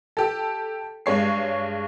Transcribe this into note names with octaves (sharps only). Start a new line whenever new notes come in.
G4 A4
G2 G#3 C#5 C7